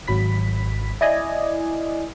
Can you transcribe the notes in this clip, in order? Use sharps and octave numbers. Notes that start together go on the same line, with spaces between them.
G#1 F#3 B5 B6
E4 D5 D#5 G#5